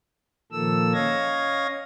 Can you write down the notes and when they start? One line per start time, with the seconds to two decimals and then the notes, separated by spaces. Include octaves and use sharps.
0.52 A#2 D#3 F3 A#3 A4 E6
0.93 C#4 C#5 D#5 F5 G#6 A#6